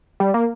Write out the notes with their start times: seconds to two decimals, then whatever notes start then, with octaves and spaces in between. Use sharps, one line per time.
0.20 G3
0.34 A#3